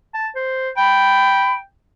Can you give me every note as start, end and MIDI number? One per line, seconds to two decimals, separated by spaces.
0.14 0.27 81
0.36 0.69 72
0.77 1.63 79
0.77 1.53 83